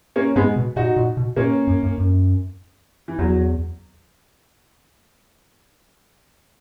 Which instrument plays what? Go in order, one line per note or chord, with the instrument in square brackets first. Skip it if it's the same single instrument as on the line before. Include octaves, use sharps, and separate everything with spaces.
[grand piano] A#3 C#4
[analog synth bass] G#2 [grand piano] G#3 B3
[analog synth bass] B2
[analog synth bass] A#2 [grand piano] D#4 F#4
[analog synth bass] A#2
B2
[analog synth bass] A#2 [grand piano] A#3 C#4
[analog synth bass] F#2
F#2
F#2
[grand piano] E3
[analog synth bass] E2 [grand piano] F#3